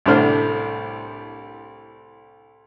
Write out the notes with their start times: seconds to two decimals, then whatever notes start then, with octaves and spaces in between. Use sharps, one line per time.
0.06 C2 A2 D3 D4 C5 F6